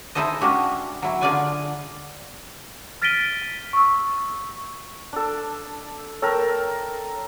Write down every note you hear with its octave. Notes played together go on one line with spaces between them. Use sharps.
D#4 E4 G#4 A4 C5 D#5
G#3 A#3 C#4 D4 F#4 G4
F#3 E4
D3 F4 G#4 D5 F#5 G#5
F6 A6 B6 D7 D#7 G7
C#6 E6
D4 A4
A4 A#4 C#5 G5